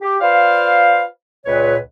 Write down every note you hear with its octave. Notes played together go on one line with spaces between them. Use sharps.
G4
F4 B4 C5 D5 F5
C#2 A#2 B4 C#5